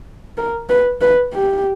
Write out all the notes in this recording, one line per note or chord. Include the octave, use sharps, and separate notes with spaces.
A#4
B4
B4
G4